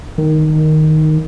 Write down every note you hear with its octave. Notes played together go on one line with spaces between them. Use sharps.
D#3